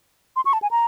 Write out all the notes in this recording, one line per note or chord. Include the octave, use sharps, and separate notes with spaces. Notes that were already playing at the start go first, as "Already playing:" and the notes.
C6
C#6
A5
G#5
A#5